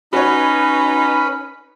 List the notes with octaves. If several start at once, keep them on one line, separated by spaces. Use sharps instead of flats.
C#4 D#4 F#4 B4 C#5